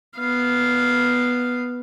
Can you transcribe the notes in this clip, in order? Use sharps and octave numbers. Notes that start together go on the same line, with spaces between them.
B3 F5